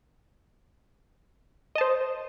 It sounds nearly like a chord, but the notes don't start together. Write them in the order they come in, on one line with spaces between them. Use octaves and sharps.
D#5 A5 C5